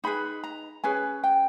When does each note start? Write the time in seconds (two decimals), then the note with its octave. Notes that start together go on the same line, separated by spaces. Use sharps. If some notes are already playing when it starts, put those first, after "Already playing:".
0.04 D#4 G#4 B4 B5
0.44 A#5
0.84 C#4 G#4 B4 G#5
1.24 G5